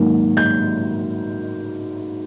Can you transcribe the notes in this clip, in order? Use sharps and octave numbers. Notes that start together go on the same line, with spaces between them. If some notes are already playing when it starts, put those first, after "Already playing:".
Already playing: G#2 D#3 F#3 A#3
G6